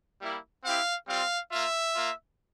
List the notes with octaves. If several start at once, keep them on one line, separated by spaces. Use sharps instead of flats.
G3 A#3 E4
C4 E4 G4 F5
G3 C4 F4 F5
A#3 F4 E5
A#3 F4